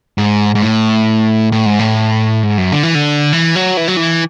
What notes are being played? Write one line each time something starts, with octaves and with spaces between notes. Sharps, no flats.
G#2
G#2
A2
A2
G#2
A2
G#2
F#2
D3
E3
D3
E3
F#3
E3
F#3
E3